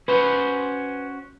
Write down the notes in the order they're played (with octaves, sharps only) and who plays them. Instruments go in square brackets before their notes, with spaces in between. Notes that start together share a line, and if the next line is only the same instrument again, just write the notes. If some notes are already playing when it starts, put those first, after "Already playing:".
[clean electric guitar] C#4 F#4 C5 [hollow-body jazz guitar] B4